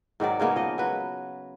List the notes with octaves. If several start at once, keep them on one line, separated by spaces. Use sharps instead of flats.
G#2 D#3 F#3 D5
C#3 G#3 A#3 B3
F3 D#5
F#3 B4